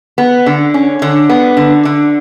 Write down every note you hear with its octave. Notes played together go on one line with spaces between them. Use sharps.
B3
D3
C#4
D3
B3
D3
D3